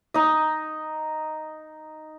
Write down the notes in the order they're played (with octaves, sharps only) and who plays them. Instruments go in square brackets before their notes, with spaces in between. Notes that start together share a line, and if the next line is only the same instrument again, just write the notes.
[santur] D#4 D#5